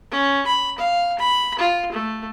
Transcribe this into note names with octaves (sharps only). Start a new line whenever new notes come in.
C#4
B5
F5
B5
F4
A3